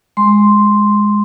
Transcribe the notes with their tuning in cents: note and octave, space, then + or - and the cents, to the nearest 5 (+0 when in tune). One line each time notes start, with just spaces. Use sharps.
G#3 -5 C6 +0